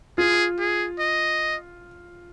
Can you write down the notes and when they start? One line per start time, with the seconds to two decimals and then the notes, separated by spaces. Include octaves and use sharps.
0.18 F4 G#4
0.59 G#4
0.99 D#5